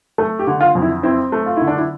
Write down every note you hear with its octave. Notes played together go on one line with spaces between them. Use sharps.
A3 A4
G4
D3
F4
F2
E4
C4 E4
A3
F4
D3 E4
D4
E4